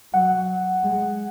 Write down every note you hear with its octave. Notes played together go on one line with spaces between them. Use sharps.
F#3 F#5
G#3